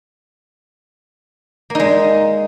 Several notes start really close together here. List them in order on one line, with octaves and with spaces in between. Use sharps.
A#3 D#4 G#3